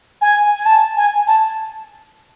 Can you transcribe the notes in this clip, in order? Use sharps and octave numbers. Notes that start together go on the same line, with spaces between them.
G#5
G#5
A5
G#5
A5